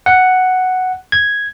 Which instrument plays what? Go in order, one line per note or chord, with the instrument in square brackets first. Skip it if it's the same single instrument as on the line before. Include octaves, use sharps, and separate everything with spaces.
[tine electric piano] F#5
G#6